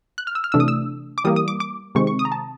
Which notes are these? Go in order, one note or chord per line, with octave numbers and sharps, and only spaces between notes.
F#6
F6
E6
F6
C3 E3 A3 D4 E6
D#6
E6
D6
E3 G3 A#3 D#6
D#6
D6
D6
C3 D#3 G#3 C4 C#6
C#6
D#6
A#5
A5